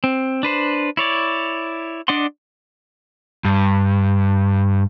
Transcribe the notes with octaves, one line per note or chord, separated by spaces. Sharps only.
C4
D4 B4 C5
E4 C#5 D5
D4 D5 D#5 F#5 C6
G2